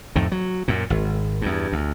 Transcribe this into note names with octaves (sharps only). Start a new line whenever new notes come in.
F2 A2 D#3
F#3
F#2 A#2
G#1
E2 G2
D2